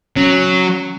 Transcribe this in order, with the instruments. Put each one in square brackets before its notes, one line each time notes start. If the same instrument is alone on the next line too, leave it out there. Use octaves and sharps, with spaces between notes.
[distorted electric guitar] F#3 [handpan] C#4